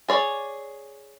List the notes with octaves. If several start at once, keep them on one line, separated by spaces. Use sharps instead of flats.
G#4 C#5 D5